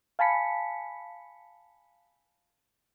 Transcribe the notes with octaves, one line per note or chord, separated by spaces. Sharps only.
F5 G#5 A5 B5 B6 C#7